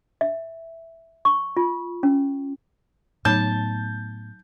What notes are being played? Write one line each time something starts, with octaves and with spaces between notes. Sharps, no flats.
E5
C#6
F4
C#4
A2 F#3 A3 B3 D#4 C#5 A5 G6